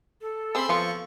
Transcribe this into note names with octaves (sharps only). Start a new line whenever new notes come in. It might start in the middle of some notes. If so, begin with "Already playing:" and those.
A4
C4 G#4 B5 C6 E6
F3 B3 F4 A4 C#6